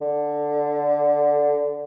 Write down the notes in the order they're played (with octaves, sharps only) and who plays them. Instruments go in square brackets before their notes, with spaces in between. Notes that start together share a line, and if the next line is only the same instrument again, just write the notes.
[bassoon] D3